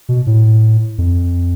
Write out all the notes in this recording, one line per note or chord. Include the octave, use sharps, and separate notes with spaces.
B2
A2
F2